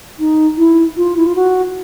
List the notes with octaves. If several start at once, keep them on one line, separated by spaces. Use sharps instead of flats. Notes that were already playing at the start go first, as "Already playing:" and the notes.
D#4
E4
F4
E4
F4
F#4